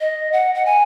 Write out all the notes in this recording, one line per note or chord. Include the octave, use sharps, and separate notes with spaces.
D#5
F#5
F#5
G#5